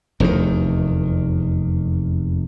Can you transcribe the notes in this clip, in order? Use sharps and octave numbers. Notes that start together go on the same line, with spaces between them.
F1 E2 G#2 D#3